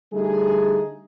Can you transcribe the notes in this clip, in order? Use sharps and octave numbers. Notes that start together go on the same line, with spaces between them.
D3 G3 A3 D#4 G#4